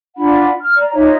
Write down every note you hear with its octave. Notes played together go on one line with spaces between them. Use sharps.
D4 F4 F#5 B5
F6
D5 A#5
D#4 F4 C#5 E5